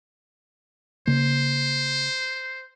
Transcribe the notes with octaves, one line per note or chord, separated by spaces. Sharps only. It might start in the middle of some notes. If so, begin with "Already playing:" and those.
C#3 A#3 C5